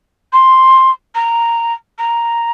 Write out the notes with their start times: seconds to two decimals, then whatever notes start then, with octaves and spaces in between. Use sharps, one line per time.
0.32 C6
1.15 A#5
1.98 A#5